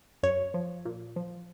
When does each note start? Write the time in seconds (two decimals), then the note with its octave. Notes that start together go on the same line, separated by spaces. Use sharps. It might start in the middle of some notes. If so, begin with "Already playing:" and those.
0.23 F#2 C#5
0.54 F3
0.85 A#2
1.16 F3